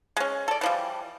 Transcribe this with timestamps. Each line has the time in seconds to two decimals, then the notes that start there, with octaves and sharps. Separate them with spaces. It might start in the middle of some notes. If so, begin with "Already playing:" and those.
0.17 G#3 C#4
0.48 A4 D5
0.61 E3 F3 G3